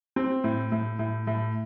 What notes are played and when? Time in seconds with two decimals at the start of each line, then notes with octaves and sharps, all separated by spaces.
0.16 C4
0.44 A2
0.72 A2
0.99 A2
1.27 A2